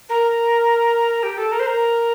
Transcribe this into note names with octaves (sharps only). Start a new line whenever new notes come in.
A#4
G4
A4
A#4
C5
A#4